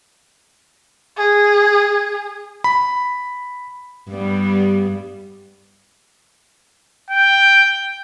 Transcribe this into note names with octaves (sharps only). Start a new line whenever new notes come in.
G#4
B5
G2 G3 B3
G5